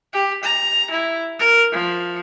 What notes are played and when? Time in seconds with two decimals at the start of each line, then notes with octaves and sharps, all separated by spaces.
0.13 G4
0.44 A#5
0.91 E4
1.39 A#4
1.72 F3